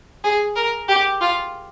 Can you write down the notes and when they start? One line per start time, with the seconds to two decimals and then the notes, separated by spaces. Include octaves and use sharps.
0.24 G#4
0.56 A#4
0.88 G4
1.21 F4